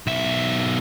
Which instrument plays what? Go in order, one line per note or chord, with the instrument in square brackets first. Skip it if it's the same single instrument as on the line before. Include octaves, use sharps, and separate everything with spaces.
[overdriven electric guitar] B1 E5